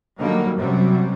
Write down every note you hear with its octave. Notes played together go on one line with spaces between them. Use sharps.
D3 D#3 F#3 G3 A#3
F#2 C3 F#3 G3